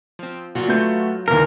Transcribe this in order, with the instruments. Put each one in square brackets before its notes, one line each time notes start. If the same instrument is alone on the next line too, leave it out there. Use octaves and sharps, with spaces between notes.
[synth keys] F3 C4
[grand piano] A#2 [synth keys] F#3 F4 F#4
[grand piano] A3 B4 G6
[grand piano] D#2 A#2 E3 [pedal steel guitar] A#4